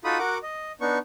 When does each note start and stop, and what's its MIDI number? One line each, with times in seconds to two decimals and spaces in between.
0.04 0.18 63
0.04 0.18 65
0.04 0.18 66
0.04 0.18 69
0.04 0.18 83
0.04 0.18 87
0.19 0.38 66
0.19 0.38 70
0.19 0.38 78
0.19 0.38 86
0.43 0.72 75
0.81 0.98 59
0.81 0.98 62
0.81 0.98 63
0.81 0.98 85